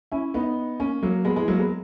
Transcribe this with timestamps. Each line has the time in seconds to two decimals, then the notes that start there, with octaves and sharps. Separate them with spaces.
0.12 C#4 E4
0.34 B3 D#4
0.80 A#3 C#4
1.03 F#3 A#3
1.25 G#3 B3
1.36 E3 G#3
1.48 F#3 A#3
1.59 G#3 B3